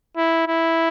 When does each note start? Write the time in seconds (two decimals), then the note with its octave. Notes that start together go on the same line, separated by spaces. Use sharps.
0.17 E4
0.48 E4